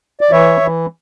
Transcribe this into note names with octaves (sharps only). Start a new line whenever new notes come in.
D5
E3 C#5 E5
E3